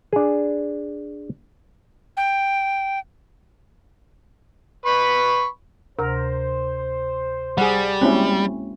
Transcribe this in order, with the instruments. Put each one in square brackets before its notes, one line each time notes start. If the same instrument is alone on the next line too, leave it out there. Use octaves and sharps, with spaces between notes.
[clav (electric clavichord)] D4 G#4
[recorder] G5
[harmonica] B4 B5 C#6
[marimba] D2 C3 [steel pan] A#4 [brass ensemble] C5
[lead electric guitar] G3 [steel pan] G#4 F#5
[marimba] G#3 A#3 F#4 [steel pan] C4 C#4 E4